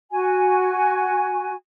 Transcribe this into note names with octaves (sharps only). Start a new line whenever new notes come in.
F#4 G#5